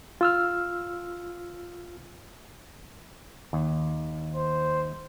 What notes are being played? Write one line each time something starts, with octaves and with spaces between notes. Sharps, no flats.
F4 E6 F6
D#2
C5